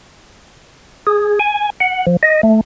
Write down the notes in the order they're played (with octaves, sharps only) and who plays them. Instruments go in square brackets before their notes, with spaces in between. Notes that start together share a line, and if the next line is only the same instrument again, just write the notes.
[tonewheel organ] G#4
G#5
F#5
F3
D#5
A3